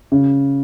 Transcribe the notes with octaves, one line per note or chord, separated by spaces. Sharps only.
C#3